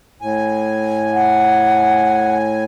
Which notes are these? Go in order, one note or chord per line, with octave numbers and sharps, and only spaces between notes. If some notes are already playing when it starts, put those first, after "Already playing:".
A2 G#5
F#5